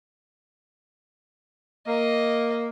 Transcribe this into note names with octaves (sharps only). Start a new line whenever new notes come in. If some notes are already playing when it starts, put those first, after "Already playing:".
A#3 D#5